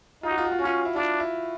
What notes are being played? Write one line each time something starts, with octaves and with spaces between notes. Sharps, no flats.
D#4 F4
F#4
F4
F#4
F4
C#4 F#4
F4
E4
D4 F4
E4